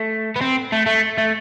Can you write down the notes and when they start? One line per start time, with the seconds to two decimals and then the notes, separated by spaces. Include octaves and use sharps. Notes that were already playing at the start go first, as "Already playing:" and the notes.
Already playing: A3
0.36 B3
0.41 C4
0.72 A3
0.86 A3
1.18 A3